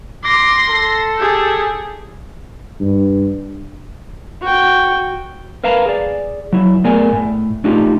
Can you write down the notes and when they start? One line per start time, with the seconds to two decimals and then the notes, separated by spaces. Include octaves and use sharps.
0.24 C6 D6 A#6
0.70 A4
1.18 G4 G#4
2.80 G2
4.41 F#4 G5
5.64 A#4 B4 F5 A5 A#5
5.86 G#4 D5
6.52 F#3 E4
6.84 A3 B3 G#4 A#4 D5 G#5
7.12 A2
7.64 A3 D4 D#4 F4 G4